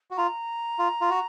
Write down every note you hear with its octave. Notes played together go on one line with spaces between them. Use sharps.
F#4
F4 A#5
F4
F4
F#4